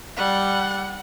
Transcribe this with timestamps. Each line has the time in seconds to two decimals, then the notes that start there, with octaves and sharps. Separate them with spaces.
0.17 G3 F#5